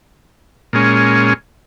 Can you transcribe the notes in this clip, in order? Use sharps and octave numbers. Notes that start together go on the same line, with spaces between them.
A#2 G#3 C#4